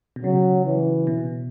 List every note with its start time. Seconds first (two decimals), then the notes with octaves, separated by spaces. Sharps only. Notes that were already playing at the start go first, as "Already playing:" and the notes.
0.16 B2
0.24 C#3 F#3
0.66 E3
1.07 B2